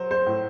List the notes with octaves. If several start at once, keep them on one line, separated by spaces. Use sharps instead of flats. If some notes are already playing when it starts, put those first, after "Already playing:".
Already playing: F#3 C5
C5
A2